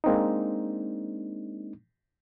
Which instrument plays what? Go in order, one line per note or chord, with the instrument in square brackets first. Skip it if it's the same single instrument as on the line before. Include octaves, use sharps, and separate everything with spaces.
[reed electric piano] G#3 A#3 C4 D4 D#4